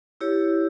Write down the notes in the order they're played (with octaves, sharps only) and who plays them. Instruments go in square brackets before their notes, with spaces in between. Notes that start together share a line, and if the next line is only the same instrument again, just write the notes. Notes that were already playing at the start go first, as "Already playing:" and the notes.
[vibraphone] E4 G4 C#5